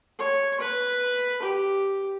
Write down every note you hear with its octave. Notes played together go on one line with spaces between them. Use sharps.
C#5
B4
G4